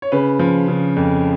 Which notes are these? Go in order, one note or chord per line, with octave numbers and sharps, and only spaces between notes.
C#5
C#3 B4
F3
C#3
F2